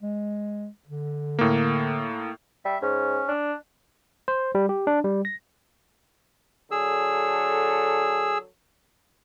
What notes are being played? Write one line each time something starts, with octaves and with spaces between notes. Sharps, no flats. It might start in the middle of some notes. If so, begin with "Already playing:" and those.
G#3
D3
A2 A#3
G3 E5
G#2 C#4
D4
C5
G3
G4
D4
G3
A#6
D3 F#3 G#4 A4 E6